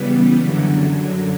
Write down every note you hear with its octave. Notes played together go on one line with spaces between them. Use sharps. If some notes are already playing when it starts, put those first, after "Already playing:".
Already playing: C#3 E3 G3 B3
F#2 D3 F#3